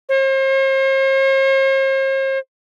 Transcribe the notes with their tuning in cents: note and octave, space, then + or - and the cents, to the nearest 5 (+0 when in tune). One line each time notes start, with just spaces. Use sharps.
C5 +45